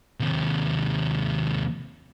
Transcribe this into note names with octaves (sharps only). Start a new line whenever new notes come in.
D#2 C3